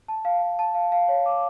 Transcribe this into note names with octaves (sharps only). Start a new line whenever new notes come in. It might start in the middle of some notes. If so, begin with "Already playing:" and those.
A5
F5
F5
A5
F5
F5
C#5
D6